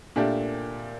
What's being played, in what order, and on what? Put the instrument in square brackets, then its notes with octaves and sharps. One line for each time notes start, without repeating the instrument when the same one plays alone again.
[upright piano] A#2 A3 D4 G4 A#4